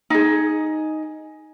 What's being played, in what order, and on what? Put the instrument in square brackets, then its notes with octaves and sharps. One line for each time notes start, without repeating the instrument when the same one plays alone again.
[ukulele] D#4 G#4